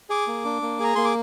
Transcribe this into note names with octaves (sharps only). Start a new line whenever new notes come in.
G#4 D6
A#3
D4
A#3
G#4 A#5
A#3 C6
D6